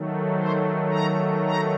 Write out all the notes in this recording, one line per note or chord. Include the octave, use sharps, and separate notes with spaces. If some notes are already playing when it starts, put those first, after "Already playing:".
Already playing: D#3 F#3 A3
C5
A#5
A#5